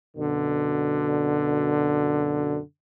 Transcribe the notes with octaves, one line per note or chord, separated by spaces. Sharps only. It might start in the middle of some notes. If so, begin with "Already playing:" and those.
F#2 B2 D3